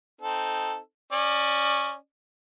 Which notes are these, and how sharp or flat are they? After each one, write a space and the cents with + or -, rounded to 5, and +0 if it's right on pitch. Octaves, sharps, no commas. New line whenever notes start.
C4 +0 D#4 +0 A4 +0
C#4 +0 D5 +25